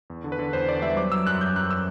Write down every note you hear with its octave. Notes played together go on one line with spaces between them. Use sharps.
E2
D3
B4
D3
E2 C5
D3 D5
G3 E5
F#3 D6
F#3 E6
F#2 F#6
F#2 G6
F#2 F#6
E6